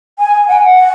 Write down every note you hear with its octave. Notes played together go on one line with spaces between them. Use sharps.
G#5
F#5
F#5